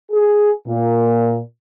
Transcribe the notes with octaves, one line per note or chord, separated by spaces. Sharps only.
G#4
A#2